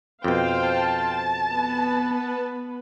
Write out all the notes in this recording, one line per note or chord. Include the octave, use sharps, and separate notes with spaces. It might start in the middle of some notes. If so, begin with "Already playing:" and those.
F2 B2 C5 F5 G5
A5 A6
B3 B4